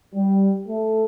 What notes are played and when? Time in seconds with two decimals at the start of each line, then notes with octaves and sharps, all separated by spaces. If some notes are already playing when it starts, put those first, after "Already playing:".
0.14 G3
0.67 A3